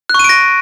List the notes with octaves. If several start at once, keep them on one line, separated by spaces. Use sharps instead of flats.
C#6 F#6 A#6 D7 D#7